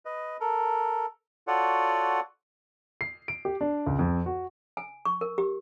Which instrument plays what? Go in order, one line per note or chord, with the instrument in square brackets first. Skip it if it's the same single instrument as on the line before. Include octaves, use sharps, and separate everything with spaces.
[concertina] B4 D#5
A4 A#4
F4 F#4 A4 C#5 D5 F#5
[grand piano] C7
D7
G4
D4
C#2
F2
F#4
[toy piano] G#5
C#6
A#4
G4